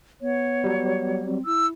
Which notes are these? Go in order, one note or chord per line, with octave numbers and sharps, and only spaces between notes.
B3 C#5
F#3 G3
C4
E4 E6